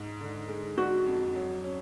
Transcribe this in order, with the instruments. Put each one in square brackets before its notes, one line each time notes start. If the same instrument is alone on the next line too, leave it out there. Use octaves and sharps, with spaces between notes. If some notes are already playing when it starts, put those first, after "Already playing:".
Already playing: [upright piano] G#2
D3
G#3
[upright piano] D4 [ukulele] F#4
[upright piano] F2
F#3
C#4